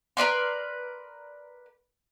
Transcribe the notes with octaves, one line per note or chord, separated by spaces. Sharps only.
A#4 B4 D5 C6